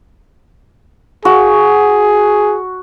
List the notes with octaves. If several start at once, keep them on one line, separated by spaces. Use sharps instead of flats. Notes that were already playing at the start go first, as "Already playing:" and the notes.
F#4 G#4